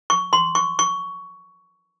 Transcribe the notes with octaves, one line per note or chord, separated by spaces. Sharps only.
C#6
C6
C#6
C#6